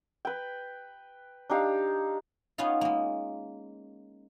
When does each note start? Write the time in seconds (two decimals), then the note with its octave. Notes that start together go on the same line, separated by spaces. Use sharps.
0.25 B4 G5
1.50 D4 D#4 G4 F5
2.58 B3 C#4 D#4 F4 F5
2.81 G#3 A#3